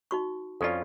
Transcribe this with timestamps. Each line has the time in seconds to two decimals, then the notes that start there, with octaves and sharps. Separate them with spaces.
0.11 D#4 F#4 C#6
0.61 F2 C#4 F4 A4 D5